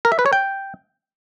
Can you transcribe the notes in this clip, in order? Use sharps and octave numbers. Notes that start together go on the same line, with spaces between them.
A#4
E5
B4
C#5
G5